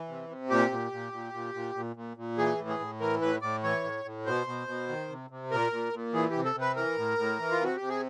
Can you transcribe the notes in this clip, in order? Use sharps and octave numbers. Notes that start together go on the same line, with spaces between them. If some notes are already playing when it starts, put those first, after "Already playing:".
Already playing: E3
C3
C3
A#2 G4
A#2
A#2
A#2
A#2
A#2
A#2
A#2
A#2
E3 G#4
A2
G#4
A2
E3 A#4
A2 B4
A2 D5
E3 C#5
A2
A2
B2 C5
B2
B2
D#3
C3
C3
A#2 A#4
A#2
A#2
E3 G#4
C3 G4
A4
C3
B4
E3 A#4
A2
A2
E3
F4
C3 F#4
C3 G4
G#4